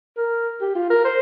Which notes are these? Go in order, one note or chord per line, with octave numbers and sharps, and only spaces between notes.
A#4
G4
F4
A#4
C5